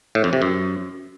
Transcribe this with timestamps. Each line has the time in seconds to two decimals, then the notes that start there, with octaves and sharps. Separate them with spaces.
0.15 A2
0.24 F2
0.33 C3
0.42 F#2